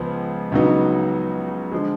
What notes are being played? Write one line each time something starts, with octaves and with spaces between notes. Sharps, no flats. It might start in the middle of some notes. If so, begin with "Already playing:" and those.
Already playing: C#2 F3 G#3 B3
C#2 C#3 F#3 B3 D#4
D3 F3 G#3